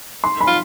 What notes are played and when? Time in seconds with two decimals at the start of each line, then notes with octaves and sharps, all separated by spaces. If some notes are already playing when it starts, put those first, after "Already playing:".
0.24 C6
0.41 B5
0.47 F4